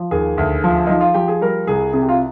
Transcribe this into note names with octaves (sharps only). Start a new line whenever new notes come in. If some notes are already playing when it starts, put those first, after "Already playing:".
Already playing: F3
D#2 G#4
D2
F3
F3 D#4
F4
F3 G4
G#4
G3 A#4
C2 G#4
C3 G#4
G4
F4